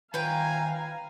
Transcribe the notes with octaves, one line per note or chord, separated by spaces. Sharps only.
D#3 F4 B4 C#5 F5 G5 G#5 A#5